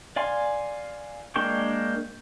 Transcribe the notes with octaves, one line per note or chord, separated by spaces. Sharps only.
D5 F5 G#5 C6
G#3 A#3 D4 G5 C#6